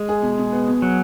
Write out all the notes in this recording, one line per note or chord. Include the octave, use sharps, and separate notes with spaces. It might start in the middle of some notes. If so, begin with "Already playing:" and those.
Already playing: G#3
G#4
B2
B2
B3
B2
F#3